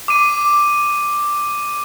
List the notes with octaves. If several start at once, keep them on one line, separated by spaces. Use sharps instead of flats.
D6 D#7